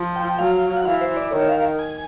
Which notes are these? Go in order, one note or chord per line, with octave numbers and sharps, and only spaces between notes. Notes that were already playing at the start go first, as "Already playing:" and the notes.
Already playing: F3
G5
F#3 F5
F#5
E3 F5
C5
D5
D#3 C#5
F5
G#5